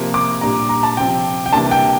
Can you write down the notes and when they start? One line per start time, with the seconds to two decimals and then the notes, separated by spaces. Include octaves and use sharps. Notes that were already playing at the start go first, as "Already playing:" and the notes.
Already playing: C3 F3 A#3
0.14 D6
0.41 A#2 G3 D4 A#5
0.69 A#5
0.83 A5
0.97 C3 F3 C4 G5
1.46 G5
1.52 C3 E3 G3 A#3 D4 A5
1.71 G5